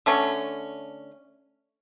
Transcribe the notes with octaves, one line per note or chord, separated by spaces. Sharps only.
D3 A3 C#4